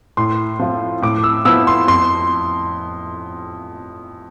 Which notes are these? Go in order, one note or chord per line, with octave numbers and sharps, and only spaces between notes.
A2 C6
F3 C4 F4
A2 D6
E6
F3 B3 E4 E6
C6
F2 C6